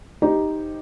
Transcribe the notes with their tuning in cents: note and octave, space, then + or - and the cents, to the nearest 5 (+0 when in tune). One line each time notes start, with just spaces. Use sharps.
D#4 +0 G4 +0 C5 +0